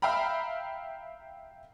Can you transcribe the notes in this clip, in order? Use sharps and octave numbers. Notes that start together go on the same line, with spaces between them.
E5 F5 G5 A#5 B5